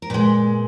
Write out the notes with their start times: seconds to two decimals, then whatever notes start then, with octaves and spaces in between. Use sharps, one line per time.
0.02 A#4
0.10 A#2 G#3 B4